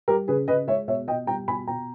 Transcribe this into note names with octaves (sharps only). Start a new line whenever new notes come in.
G3 G4 A#4
C#3 G#4 B4
C#3 B4 D#5
G#3 C#5 E5
B2 C#5 E5
B2 D#5 G5
G3 G5 A#5
B2 G#5 B5
B2 G5 A#5